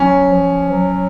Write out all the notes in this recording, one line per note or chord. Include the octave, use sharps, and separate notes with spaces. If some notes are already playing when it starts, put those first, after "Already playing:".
Already playing: F#3 C#4
F3
F#3